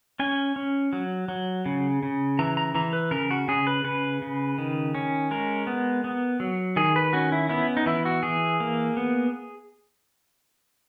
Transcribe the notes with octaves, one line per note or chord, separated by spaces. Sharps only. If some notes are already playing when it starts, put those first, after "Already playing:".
C#4 G#5
C#4
F#3
F#3
C#3
C#3
E3 A#5
A#5
E3 A#5
B4
C#3 A#4
F#4
C#3 G#4
B4
C#3 B4
C#3
D#3
C#4
G#3 A#4
B3
B3
F#3
D#3 G#4
B4
C#4 F#4
E4
B3 E4
D#4
E3 E4
F#4
E3 G#4
A#3
B3